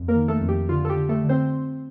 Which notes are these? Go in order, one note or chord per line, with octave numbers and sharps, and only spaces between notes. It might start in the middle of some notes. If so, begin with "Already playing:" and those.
Already playing: F2
A#3 A#4
D#3
A3 A4
F2
G4
D3 F4
A4
G4
D3
A3 A4
D3
C4 C5